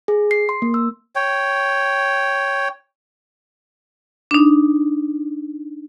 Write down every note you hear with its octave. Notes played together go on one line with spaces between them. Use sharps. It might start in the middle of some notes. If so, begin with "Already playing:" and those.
G#4
C7
C6
A#3
E6
C#5 G5
D4 D#4